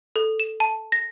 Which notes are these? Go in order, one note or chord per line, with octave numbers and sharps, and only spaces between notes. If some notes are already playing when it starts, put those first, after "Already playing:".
A4
E7
A5
A#6